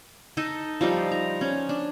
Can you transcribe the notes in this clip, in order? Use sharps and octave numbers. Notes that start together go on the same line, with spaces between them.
D#4 A4 D#5
F3 G3 D#4
A#5
C#4
D4